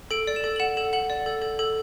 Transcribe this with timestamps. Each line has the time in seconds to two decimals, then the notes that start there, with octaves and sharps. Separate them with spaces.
0.11 A4 D7
0.27 D5
0.36 E7
0.44 A4
0.56 F#7
0.60 F#5 E7
0.77 A4 E7
0.93 F#5 F#7
1.10 D5
1.26 A4
1.42 A4
1.59 A4